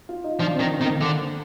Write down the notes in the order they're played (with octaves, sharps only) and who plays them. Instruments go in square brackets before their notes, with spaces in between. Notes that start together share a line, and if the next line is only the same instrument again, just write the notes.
[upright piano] F4
D#4
[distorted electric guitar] F3 [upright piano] D4
[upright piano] C4
[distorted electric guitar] D#3
[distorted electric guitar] D#3 [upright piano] C4
[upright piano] A#3
[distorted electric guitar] D3